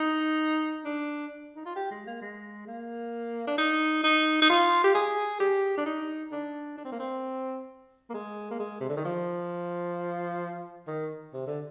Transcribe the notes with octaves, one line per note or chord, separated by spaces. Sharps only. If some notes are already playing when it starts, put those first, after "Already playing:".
Already playing: D#4
D4
D#4
F4
G4
G#3
A#3
G#3
A#3
D4
D#4
D#4
D#4
F4
G4
G#4
G4
D4
D#4
D4
D4
C4
A#3
C4
A#3
G#3
A#3
G#3
C3
D3
D#3
F3
D#3
C3
D3